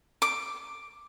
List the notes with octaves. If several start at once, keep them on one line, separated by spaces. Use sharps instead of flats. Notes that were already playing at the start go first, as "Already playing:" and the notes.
D6